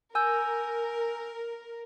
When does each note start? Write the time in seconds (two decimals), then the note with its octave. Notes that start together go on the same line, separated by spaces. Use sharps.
0.15 A#4 G#5 E6 G6